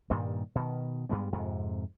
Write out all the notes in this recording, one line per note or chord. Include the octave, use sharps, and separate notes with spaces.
G2 A#2 D#3 G3
B2 D#3
G2 G3 G#3 B3
F2 G#2 C3